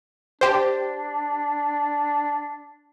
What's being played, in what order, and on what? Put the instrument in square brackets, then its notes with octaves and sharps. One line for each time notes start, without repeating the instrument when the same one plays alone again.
[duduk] D4 [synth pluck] G4 C5